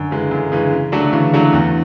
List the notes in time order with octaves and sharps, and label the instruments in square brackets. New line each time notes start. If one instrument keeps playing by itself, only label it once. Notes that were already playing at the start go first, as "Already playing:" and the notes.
Already playing: [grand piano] F#2 [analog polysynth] D3
[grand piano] C#3 E3 G#3
F#2
C#3 E3 G#3
C#3
F#3 A3 D4 F#4
[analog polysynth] D3
[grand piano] C#3 [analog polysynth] E3
[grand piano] F#3 A3 D4 F#4
E2